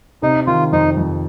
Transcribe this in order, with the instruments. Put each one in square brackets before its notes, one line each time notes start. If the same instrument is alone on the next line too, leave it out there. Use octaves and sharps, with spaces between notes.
[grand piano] C3 [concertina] D#4
[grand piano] D#3 [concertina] F4
[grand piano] F2 [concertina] D#4
[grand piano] F2